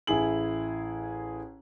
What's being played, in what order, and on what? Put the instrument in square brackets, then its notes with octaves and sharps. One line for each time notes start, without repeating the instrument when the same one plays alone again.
[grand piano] A1 E4 G#4 F#7